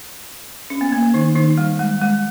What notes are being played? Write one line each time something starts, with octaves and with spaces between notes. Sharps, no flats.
C#4
B3
A#3
A#3
D#3 D#4
D#3 D#4
G3
G#3
G#3